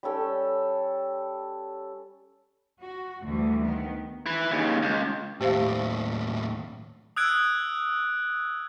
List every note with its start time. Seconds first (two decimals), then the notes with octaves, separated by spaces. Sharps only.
0.03 G3 C#4 A4 G5
2.81 F#4
3.24 D2 E3 G3
3.63 D#3 B3
4.26 E4 B4
4.51 D#2 C#3
4.83 C#2
5.41 D#2 A2 G4 C5 F5
7.16 D#6 E6 F#6 G#6 D7